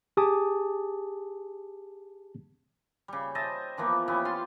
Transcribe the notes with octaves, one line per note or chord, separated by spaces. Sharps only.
G4 G#4 G#5 A5 D6 D#6
C#3 G3
C5 D#5 E5 A5
E3 F3 A#3 B3
B3 C#4 E4 G4
F4 C6